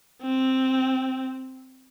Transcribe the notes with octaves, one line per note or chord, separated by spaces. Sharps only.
C4